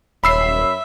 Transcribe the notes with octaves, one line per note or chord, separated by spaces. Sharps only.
D#1 F#2 C#5 E5 B5 E6 C7